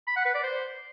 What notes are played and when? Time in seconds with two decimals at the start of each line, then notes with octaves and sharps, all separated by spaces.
0.07 B5
0.16 F#5
0.25 B4
0.34 D5
0.44 C5